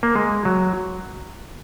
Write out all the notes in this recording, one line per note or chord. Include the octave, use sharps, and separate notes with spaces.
A#3
G#3
F#3